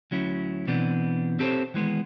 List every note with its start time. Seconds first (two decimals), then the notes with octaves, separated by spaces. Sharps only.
0.11 D2 F#3 C#4 E4
0.67 B2 E3 B3 C4 D4
1.39 C4 G4 A4 A#4 C5 C#5
1.74 D#3 E3 G#3 B3